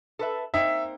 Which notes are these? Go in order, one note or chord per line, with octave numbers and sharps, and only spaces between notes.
A4 B4 E5
A#3 C4 D#4 E5